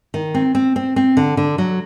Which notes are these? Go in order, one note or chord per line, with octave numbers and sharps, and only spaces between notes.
D#3
C4
C4
C4
C4
D3
D3
F#3